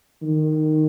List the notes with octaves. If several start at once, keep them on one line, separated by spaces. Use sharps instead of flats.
D#3